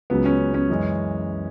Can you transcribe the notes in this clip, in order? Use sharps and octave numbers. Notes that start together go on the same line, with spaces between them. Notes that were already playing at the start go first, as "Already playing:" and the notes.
C#2 C#3 F#3 B3
C#4
C#4
F#2 E3 G#3